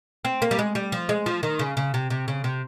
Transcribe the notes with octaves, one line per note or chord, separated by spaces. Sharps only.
C4
A#3
G3
G#3
G3
F3
G#3
F3
D#3
C#3
C#3
C3
C3
C#3
C3